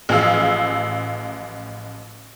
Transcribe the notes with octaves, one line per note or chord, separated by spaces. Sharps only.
A1 F3 G#4 F5 E6